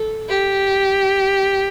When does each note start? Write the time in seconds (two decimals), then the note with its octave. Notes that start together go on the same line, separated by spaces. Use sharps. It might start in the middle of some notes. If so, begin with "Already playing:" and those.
Already playing: A4
0.29 G4